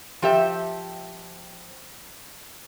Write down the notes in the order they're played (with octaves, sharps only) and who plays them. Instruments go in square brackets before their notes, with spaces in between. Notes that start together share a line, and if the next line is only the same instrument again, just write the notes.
[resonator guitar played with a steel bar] F3 G4 E5